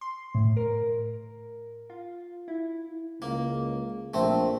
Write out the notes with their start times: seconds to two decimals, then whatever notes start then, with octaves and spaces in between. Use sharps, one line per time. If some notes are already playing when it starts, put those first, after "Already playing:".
0.01 C6
0.35 A2
0.57 A#4
1.90 F4
2.48 E4
3.22 C#2 A#3
4.14 A#1 A3 C4